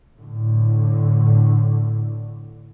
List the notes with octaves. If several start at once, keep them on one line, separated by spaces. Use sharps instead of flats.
A2 D3